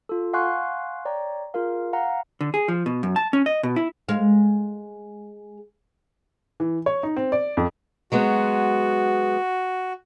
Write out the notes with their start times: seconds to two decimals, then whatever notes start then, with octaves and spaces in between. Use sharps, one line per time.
0.09 F4 A4
0.33 F5 F#5 G#5 C6 C#6 F#6
1.05 C#5 D5 G5 A#5
1.54 F4 G#4 A#4 F5
1.93 F5 F#5 A#5
2.41 D3
2.54 G#4
2.68 F3
2.86 B2
3.03 F#2
3.16 A5
3.33 C#4
3.46 D#5
3.63 B2
3.76 E4
4.09 G#3 F5
6.60 E3
6.86 C#5
7.03 D#4
7.17 C4
7.32 D5
7.57 F2
8.12 F#3 G#3 B3 F#4